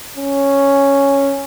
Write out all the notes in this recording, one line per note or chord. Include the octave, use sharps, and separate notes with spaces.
C#4